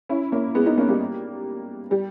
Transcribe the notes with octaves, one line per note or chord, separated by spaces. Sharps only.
C#4 E4
A#3 C#4
G#3 B3
B3 D#4
A#3 C#4
G3 A#3
G3